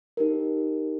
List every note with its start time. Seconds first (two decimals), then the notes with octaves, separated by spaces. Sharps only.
0.17 D#4 G4 A#4